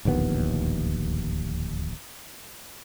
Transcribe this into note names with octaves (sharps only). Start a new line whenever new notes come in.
D1 A#1 D#2 B3